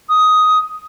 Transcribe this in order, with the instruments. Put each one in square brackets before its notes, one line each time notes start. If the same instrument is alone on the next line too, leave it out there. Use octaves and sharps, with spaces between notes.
[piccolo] D#6